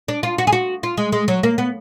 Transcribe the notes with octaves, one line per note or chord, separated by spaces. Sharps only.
D4
F4
F#4
G#4
F#4
F4
G#3
G#3
F#3
A#3
B3